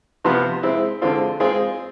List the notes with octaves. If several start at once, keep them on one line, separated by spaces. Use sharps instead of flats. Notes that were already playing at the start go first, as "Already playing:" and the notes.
C3 F3 B3
G#3 C4 E4
D3 G#3 C4 F4
G#3 C4 F4 G#4